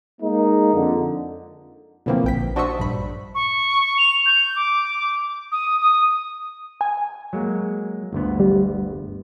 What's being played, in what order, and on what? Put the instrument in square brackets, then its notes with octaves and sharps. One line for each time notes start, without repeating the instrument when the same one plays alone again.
[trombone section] G#3 A#3 D#4
F2 D3
[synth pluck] B2 D3 E3 F3 A#3 C4
A#1 G5 B6
D4 F#4 C5 D#5 E5 C#6
A#1 G2 B5
[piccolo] C#6
F7
G6
D6
D#6
D#6
[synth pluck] G#5
[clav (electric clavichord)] F#3 G#3 A#3
G1 D2 B3
[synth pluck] G3